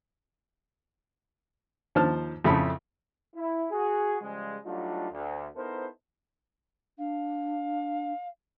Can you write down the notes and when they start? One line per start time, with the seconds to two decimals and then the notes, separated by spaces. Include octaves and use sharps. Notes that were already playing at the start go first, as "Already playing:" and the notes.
1.95 D#2 F3 C5 A5 F6
2.44 F2 A2 C#3 A3 A5 B5
3.35 E4
3.71 F#4 G#4
4.22 C#3 F3 G3 G#3
4.65 F#3 G3 A3 D4 D#4 F4
5.11 D2
5.56 B3 D#4 E4 A4 A#4 C5
6.98 D4 F5